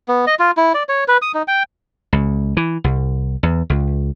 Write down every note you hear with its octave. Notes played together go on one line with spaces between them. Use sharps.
B3
D#5
F4
E4
D5
C#5
B4
D#6
D#4
G5
C#2
E3
C2
E2
C#2